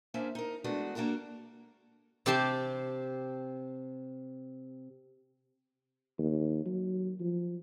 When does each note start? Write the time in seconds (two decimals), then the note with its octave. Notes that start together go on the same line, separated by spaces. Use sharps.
0.14 A#3 C#4 D4 C5 E5
0.35 D#4 A#4
0.64 E3 G#3 A3 B3 D4 F#4
0.95 A#3 D4 F#4 A4 A#4
2.26 C3 C4 G4 A5 C6
6.19 D#2
6.66 F#3
7.20 F3